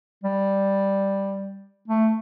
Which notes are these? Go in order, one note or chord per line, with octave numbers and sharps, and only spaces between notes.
G3
A3